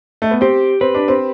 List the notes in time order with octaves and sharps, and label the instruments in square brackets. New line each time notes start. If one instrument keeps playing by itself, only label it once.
[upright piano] A3
B3
[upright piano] C4 [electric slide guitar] G4
[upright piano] C4 [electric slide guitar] B4
[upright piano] D4
C4